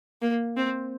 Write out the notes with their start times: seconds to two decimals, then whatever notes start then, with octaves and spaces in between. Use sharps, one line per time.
0.22 A#3
0.57 C4